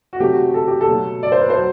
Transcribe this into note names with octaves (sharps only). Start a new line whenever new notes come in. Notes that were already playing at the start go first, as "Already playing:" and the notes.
F#4
C3 F#3 A3 G4
F#4
A4
G4
A4
B2 F#3 A3
D5
C5
B4
C5
F#3